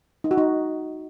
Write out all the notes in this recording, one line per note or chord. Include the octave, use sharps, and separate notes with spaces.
D#4
F#4
D#4